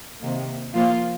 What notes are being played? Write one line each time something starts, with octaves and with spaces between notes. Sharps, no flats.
C3 D#3 A#3
F3 A#3 F4